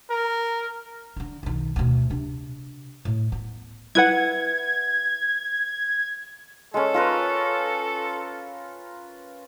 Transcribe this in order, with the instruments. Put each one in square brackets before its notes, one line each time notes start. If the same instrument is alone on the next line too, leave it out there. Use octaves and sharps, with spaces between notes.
[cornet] A#4
[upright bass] D3 D#3
B1 D#3
D2 B2
C3 D4
A2
B3
[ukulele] E4 B4 F#5 [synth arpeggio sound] G#6
[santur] G#3 C#4 [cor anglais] A4
[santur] F4 A#4 B4